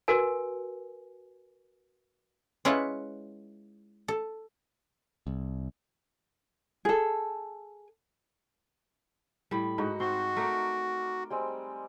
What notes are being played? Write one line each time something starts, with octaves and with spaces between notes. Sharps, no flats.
F#4 A#4 B4 G#5
G#3 C#4 E4 F4 B4 F#5
A4
C2
G#4 A4
A2 G3 B5
G#2 D#4 F#4
C4 F#4 C6
A3 D#4 A#4 D5
G3 G#3 C4